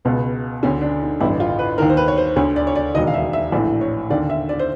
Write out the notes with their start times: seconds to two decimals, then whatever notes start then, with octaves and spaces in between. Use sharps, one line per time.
0.05 C#2 B2 B3
0.63 D2 D3 C#4
0.81 D4
1.02 D#4
1.20 A1 G2 D3 E4
1.40 F4
1.59 B4
1.78 D#2 D#3 A#4
1.90 C5
1.97 B4
2.08 C#5
2.18 C5
2.36 D2 D3 C#5
2.56 D5
2.67 C#5
2.75 D5
2.94 E1 D#2 D#3 D#5
3.07 F5
3.14 E5
3.33 E5
3.52 A#1 A2 E3 D5
3.81 C#5
4.10 D#2 D3 D5
4.30 E5
4.49 D5
4.59 C5